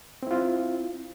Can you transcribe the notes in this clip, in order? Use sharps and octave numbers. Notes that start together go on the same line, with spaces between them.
C4 E4 F4